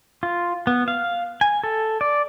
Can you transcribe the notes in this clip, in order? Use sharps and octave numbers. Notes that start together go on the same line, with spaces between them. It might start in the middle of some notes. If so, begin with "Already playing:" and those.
F4
B3
F5
G#5
A4
D5